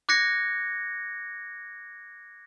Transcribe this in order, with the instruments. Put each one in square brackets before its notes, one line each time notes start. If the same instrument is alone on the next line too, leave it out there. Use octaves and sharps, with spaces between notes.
[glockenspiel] D6 F#6 G#6 A#6 C#7